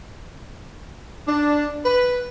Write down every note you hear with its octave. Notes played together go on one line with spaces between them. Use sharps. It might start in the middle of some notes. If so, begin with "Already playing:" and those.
D4
B4